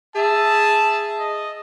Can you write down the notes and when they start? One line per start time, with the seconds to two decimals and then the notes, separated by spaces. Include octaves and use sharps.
0.16 G#4 E5 A5
1.20 D#5